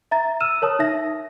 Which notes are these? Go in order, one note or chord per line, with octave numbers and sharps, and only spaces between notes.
E5 A#5 A6
E6 F6 D#7 E7
A#4 C#5 A5 D#6
D#4 E5 A#6